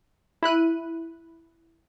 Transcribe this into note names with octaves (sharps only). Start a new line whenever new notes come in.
E4 B5 F#6 D#7